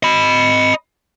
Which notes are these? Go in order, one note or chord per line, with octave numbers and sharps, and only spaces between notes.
D#5 B5